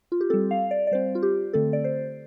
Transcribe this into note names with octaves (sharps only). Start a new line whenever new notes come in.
F4
G4
G3 C4 A4
F5
D5
D5
G3 C4 C5
F4
G4
D3 A3 C4 A4
D5
C5